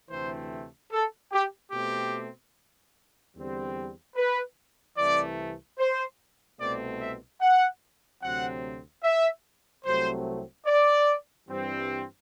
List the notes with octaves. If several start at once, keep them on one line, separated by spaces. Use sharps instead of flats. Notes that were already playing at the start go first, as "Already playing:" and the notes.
D2 C3 E3 A3 C4 C5
A4
G4
B2 A3 C4 G4
E2 D3 G3 C4
B4
C2 C3 E3 A3 D5
C5
C2 B2 A3 C4 D5
E5
F#5
D2 C3 F#3 C4 F#5
E5
C2 C3 F#3 A3 C4 C5
D5
G2 E3 G3 C4